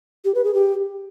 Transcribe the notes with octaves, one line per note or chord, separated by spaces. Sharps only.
G4
B4
G#4
G4